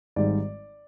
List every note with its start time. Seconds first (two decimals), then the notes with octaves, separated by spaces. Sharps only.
0.16 G#1 G#2 G3 D5